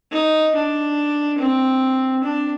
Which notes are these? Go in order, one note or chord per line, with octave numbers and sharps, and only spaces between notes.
D#4
D4
C4
D4